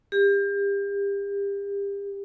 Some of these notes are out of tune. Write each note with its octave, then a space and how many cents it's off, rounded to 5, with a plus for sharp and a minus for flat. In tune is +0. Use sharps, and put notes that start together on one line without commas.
G4 +35